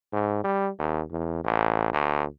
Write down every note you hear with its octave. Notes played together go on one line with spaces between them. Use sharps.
G#2
G3
D#2
E2
A1
D2